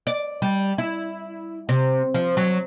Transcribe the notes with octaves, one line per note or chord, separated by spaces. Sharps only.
D5
G3
E4
C3
F3
F#3